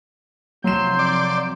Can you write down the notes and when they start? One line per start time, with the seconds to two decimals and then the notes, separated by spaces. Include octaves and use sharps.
0.64 C3 F3 F#3 C6 G6 E7
0.99 D5